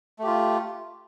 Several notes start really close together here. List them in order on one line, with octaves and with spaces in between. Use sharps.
A3 G4 F4